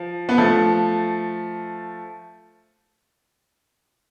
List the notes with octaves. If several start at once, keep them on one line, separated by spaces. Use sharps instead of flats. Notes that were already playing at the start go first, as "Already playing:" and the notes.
Already playing: F3
B3
F3 A3